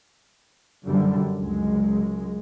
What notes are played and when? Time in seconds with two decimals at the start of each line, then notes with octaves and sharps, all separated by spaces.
0.85 F#2 D3 G3
1.37 C#2 F#2 G#3